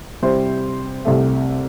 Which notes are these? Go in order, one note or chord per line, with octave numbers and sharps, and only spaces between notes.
C3 G3 E4 C5
C2 C3 A3